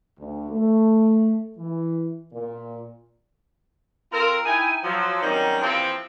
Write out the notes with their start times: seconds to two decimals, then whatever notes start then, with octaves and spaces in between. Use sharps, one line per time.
0.18 D2
0.51 A3
1.58 E3
2.33 A#2
4.12 C4 F4 A4 A#4
4.45 D#4 E4 G5 G#5
4.84 F3 F#3
5.22 D#3 F#3 G3 C4 C#4 D#4
5.61 C3 E3 F3 A#3 C4